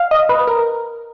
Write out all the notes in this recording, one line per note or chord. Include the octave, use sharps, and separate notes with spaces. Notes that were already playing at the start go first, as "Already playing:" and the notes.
Already playing: F5
D#5
B4
A#4